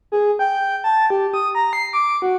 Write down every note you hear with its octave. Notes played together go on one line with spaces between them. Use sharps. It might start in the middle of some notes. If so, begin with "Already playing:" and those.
G#4
G5
A5
G4
D#6
A#5
C7
D6
F#4